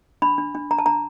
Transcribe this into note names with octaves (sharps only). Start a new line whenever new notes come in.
D4 B5
D4
D4
D4 A#5
A5
D4 A#5